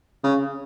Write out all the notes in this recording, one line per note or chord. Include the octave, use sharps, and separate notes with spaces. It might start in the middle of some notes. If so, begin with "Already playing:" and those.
C#3